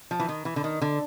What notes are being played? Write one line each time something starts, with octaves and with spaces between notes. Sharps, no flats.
F3
E3
D#3
E3
D3
D#3
D3